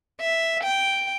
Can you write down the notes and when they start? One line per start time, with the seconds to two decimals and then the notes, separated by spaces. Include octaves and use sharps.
0.20 E5
0.63 G5